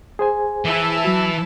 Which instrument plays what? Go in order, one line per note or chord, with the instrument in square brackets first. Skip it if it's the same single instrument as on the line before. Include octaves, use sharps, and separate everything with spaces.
[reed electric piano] G#4 C5 G#5
[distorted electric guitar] E3 [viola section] E4 E5 A5
[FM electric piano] F#3 F#4